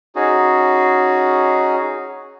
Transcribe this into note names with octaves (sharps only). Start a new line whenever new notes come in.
C#4 D#4 F#4 G#4